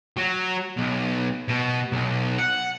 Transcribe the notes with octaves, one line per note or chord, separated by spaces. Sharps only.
F#3
B1
B2
B1
F#5